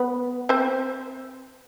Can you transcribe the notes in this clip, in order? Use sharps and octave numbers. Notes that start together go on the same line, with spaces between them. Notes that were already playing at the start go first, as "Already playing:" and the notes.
Already playing: B3 B4
C4 C5